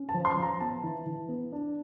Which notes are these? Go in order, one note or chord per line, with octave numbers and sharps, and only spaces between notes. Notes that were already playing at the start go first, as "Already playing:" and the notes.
Already playing: C#4
A5
F3
C6
F3
A#5
B3 A5
E3
E3
B3
D4